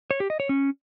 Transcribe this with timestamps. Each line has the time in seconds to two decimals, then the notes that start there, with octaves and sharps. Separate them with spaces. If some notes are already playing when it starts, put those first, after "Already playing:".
0.11 C#5
0.20 G4
0.30 D#5
0.40 C#5
0.49 C#4